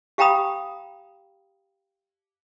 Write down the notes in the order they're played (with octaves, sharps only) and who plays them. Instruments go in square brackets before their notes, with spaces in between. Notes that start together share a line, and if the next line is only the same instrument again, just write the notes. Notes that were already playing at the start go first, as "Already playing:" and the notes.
[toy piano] G4 F5 G5 A#5 B5 D#6